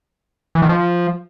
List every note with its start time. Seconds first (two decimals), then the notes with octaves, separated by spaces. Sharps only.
0.55 E3
0.62 D#3
0.69 F3